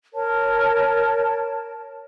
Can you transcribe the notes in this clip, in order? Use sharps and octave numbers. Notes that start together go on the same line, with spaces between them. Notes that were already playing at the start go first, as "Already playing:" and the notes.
A#4 C#5 A5